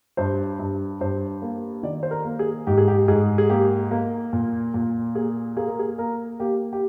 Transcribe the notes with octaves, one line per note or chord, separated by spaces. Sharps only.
G2 C5
G2
G2 C5
A#3
D#3 D5
C5
A#4
A#3
G#4
G#2 G4
G#4
G4
G#2 G#4
G#4
A#3 G4
A#3
A#2
A#2
A#3 G#4
A#3 G#4
A#4
G#4
A#3 A#4
A#3 G4
G4